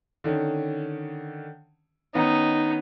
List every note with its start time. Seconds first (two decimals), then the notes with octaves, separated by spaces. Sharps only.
0.24 D3 D#3 C#4
2.15 D#3 B3 C#4 D#4